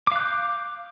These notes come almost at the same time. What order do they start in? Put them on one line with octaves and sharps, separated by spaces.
D6 F5 F#6 G6